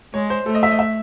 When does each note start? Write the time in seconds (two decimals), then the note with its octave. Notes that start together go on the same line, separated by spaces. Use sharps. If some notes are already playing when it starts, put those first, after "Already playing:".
0.14 G#3 C#5
0.30 C5
0.46 A3 A4
0.55 D#5
0.63 E5
0.71 D#5
0.79 E5